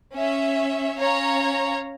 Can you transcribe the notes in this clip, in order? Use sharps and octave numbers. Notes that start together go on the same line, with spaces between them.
C#4 E5
C#4 C#5 F5 A#5